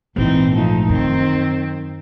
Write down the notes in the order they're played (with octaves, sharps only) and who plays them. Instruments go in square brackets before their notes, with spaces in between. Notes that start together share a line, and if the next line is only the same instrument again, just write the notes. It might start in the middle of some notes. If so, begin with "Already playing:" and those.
[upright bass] A#1 G#2 [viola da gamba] E3 C4 D#4
[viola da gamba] F3 A3 D#4
[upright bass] F#2 [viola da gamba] D#3 C4